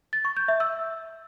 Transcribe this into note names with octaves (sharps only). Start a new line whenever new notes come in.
A6
C#6
G6
E5
E6